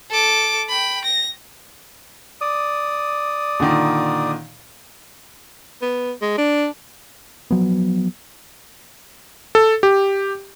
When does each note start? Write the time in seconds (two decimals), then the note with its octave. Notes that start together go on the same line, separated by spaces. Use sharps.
0.10 A4 D6
0.69 G5 B5
1.05 A#6
2.41 D5 D#6
3.60 A#2 D3 D#3
5.82 B3
6.22 G#3
6.38 D4
7.51 F3 F#3 B3
9.55 A4
9.83 G4